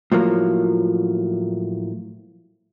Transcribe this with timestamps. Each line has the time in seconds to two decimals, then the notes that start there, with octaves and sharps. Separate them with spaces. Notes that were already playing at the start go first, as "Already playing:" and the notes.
0.12 A2 F3 F#3 A#3